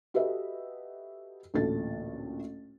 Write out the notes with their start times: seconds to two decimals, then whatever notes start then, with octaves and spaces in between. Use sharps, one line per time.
0.14 F#4 G4 A4 B4 D#5 E5
1.54 A1 D2 A#2 A4 A6